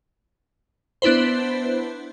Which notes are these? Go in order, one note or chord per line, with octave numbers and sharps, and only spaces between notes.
B3 D4 E4 B4 C5